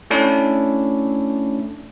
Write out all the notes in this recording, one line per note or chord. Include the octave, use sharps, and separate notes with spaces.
A3 C#4 D4 E4